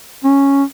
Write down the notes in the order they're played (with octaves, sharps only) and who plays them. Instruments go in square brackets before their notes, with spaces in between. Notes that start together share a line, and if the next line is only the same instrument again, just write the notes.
[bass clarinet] C#4